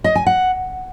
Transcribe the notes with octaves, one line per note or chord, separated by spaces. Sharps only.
D#5
G#5
F#5